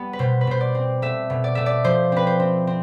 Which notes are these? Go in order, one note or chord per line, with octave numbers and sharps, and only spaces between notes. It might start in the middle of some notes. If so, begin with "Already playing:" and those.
Already playing: G3 B3
B4
B2 C5
B4
B2 C5
D5
C4
A3 E5
B2
D5
A3 E5
D5
F3 C5
C4 B4
C5
C4
C4